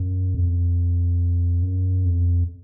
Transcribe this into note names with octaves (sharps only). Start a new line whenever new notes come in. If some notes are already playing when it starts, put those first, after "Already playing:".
Already playing: F#2
F2
F#2
F2